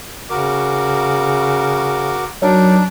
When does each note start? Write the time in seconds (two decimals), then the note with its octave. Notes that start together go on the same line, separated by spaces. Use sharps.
0.30 C#3 F#4 A#4 D6
2.42 F#3 D4 D#4 A#4